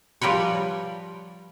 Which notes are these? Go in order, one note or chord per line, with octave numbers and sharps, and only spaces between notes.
F3 G3 A#4 B4 C#5